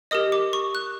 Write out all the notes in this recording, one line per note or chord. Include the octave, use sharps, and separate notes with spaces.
G4 A#4 D#5 D#6
D6
C#6
F#6